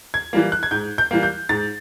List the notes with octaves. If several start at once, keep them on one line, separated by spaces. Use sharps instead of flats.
G#6
E3 G3 A#3
F#6
G#6
G#2 G6
G6
E3 G3 A#3
G6
G#2 A6